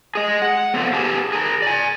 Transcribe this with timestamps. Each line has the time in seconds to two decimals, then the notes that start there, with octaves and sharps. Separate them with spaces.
0.15 G#4 D#5
0.42 F#5
0.74 B3 C4 D4 F4 A4
0.93 G4 G#4 B4 A5
1.32 G#4 A#4
1.62 D5 G#5